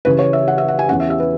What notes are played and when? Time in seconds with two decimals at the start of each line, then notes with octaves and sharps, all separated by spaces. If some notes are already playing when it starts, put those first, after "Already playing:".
0.05 C#3 E3 C#4 B4
0.19 C#5
0.33 E5
0.48 F#5
0.58 E5
0.68 F#5
0.79 G#5
0.88 E2 E3 C#4 F#5
1.00 E5
1.10 E5
1.20 B4